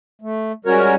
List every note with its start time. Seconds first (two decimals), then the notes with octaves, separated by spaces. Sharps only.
0.22 A3
0.65 G3 G#3 C#4 F#4 A#4 C#5